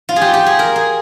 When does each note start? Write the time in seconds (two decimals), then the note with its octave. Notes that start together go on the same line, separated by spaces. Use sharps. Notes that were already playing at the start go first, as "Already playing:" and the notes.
0.09 F4
0.16 G#4
0.22 G4
0.34 G4
0.46 G#4
0.59 A#4
0.76 G#4